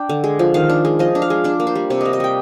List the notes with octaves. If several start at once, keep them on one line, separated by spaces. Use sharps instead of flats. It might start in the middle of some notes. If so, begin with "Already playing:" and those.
Already playing: D4 G5
D3
G#3
F3
D#3 F5
D4
G#3
F3 D#5
D4
F5
G#3
D4 D5
A#3
C5
G3
C3 D5
A#3 D#5
D#5
G3 G5